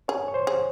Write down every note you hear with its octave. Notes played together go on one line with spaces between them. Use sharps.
G#4 C#5
C#5
C5
G#4